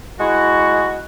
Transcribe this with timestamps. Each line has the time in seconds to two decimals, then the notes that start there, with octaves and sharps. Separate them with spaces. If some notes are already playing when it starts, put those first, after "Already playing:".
0.20 G#3 E4 F#4